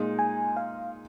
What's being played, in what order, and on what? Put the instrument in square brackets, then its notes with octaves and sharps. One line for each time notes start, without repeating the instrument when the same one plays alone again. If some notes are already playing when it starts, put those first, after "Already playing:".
Already playing: [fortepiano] A#2 G#3 D#4
[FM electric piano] G#5
F5